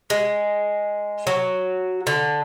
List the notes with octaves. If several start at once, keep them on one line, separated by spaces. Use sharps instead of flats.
G#3
F#3
D3